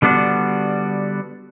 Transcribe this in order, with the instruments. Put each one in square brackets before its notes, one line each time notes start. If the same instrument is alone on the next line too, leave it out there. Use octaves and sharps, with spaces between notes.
[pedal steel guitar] D3 G3 B3 D4 F#4